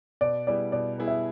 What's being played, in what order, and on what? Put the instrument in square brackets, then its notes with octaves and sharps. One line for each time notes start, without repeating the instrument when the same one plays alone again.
[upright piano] B2 [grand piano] D5
[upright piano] G3 B3 E4 G#4 [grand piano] D5
[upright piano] B2 [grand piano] D5
[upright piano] G3 B3 E4 G#4
[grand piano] E5